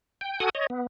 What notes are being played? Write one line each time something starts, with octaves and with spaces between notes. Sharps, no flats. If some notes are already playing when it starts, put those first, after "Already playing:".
G5
F#4 A4 F#5 G#5 D#6
C#5 D#5
B3